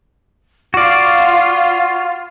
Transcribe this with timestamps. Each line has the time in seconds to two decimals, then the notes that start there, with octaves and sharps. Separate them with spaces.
0.74 F4 F#4 D5